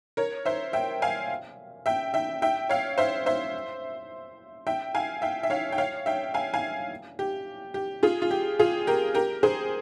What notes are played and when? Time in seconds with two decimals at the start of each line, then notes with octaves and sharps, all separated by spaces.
0.17 A#4 C#5
0.46 C5 E5
0.73 E5 G5
1.02 F5 G#5
1.86 E5 G5
2.14 E5 G5
2.42 E5 G5
2.69 C#5 F5
2.98 C5 E5
3.26 C5 E5
4.67 E5 G5
4.95 F5 G#5
5.22 E5 G5
5.43 E5
5.50 C#5 F5
5.72 G5
5.78 C#5 F5
6.06 E5 G5
6.34 F5 G#5
6.54 F5 G#5
7.19 G4
7.74 G4
8.03 F4 G#4
8.22 F4
8.31 G4
8.59 F4 G#4
8.87 G4 A#4
9.14 G4 A#4
9.43 G#4 C5